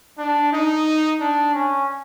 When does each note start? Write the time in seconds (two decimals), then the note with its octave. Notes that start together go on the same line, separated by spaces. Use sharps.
0.18 D4
0.53 D#4
1.20 D4
1.54 C#4